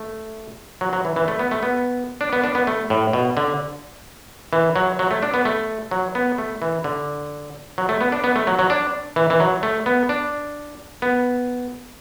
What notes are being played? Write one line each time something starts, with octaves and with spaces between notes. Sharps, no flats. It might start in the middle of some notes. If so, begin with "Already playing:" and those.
Already playing: A3
F#3
F#3
E3
E3
A3
B3
A3
B3
D4
B3
D4
B3
A3
A2
B2
D3
E3
F#3
F#3
A3
D4
B3
A3
F#3
B3
A3
E3
D3
F#3
A3
B3
D4
B3
A3
F#3
F#3
D4
E3
E3
F#3
A3
B3
D4
B3